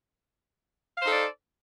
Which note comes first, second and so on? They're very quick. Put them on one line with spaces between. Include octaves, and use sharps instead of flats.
F5 C5 D#4 A4 D5